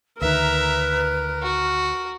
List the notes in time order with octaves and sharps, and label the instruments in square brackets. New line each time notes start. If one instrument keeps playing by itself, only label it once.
[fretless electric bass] D2 D#3 [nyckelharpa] A#4 [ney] B4 [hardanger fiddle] E5 A#5
[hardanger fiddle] F#4